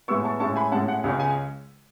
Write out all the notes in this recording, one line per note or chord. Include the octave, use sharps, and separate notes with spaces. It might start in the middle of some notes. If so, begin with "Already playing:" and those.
A2 G#3 B3 C#6 E6
A5 C#6
A2 G#3 C#4 A5 C#6
G#5 B5
A2 G#3 C#4 F#5 A5
F#5
C#2 C#3 G#3 C#4 G#5
G#5